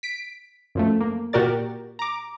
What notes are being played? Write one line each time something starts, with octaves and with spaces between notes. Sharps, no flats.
B6 D7
F#2 F3 A3
A#3
A#2 F#4 G4 A#4 D5 A6
A#5 D6